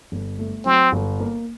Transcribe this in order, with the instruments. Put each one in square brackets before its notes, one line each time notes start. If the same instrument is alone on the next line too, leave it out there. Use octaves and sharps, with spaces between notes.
[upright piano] G1
A3
[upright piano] F#3 [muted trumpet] C4
[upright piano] G1
A#3